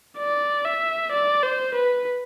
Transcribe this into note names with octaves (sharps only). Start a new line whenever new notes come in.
D5
E5
D5
C5
B4